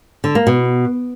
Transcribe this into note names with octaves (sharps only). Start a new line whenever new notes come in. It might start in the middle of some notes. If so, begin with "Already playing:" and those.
D3
A#3
B2